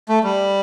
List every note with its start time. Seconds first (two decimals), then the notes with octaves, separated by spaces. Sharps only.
0.09 A3
0.24 G3